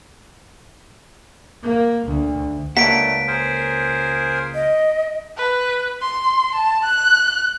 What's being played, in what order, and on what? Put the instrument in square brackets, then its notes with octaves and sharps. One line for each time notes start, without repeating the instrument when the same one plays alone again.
[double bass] A#3
D2
[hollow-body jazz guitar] C#2 A#3 F#5 [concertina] A3 D4 [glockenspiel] B6 D7
[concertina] G#4 A#4 C5
[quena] D#5
[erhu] B4
C6
A5
F#6